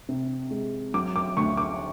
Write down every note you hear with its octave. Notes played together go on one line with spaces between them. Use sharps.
C3
G#3
F#3 D6
D6
D2 C#6
D6